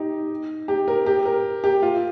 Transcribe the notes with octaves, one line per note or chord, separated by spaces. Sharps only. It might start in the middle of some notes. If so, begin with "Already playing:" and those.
Already playing: D#4 G4
G4
A#4
G4
A#4
G4
F4